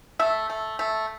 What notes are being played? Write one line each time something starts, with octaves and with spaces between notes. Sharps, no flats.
A3 E5
A3
A3